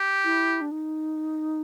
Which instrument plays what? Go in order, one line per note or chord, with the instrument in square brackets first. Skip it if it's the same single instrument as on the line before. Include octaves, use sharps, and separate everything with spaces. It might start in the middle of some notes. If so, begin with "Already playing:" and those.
Already playing: [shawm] G4
[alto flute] E4
D4
D#4